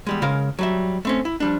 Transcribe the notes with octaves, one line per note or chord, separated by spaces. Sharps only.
E2 G3 G#3
C#3 G#3 A#4 F5
F#3 G3 E5
A3 C4 C#4
E4
F3 G3 D4